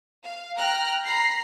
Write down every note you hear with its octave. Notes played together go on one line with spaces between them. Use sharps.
F5
G5 A#5 F6 F#6
A#5 B5 C7